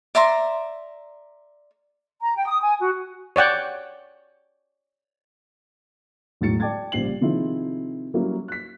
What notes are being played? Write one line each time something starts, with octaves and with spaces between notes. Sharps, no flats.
D5 E5 A#5 C6
A#5
G5
D#6
G#5
F#4
C#5 D5 F#5 G5
E1 A2 F#3 A6 C#7
D5 G5 A5 D6 G#6 A6
A#1 C#3 G3 C5 C7 F#7
C3 D#3 F3 C4 E4 G#4
F#3 G3 A#3 C#4 E4 F#4
F#6 B6